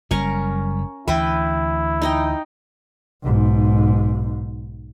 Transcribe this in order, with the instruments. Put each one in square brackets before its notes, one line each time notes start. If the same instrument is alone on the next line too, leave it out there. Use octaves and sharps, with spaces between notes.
[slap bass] F#1 G3 [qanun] C#4 A#4 C#6
[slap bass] D2 E3 [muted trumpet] E4 [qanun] B4 E5 G5
[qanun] D#4 D#5 G5
[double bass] B1 G#2